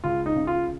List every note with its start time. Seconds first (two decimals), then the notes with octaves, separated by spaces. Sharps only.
0.04 C#2 F4
0.26 D#4
0.36 C#3
0.47 F4